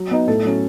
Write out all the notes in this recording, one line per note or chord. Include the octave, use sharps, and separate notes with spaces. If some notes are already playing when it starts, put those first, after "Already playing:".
Already playing: F#3
B3 D#4
A2 A4
F#3 C#4